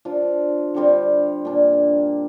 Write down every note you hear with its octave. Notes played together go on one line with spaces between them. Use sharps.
F3 D4 F4
D3 G3 C4 F4
A#2 A#3 D4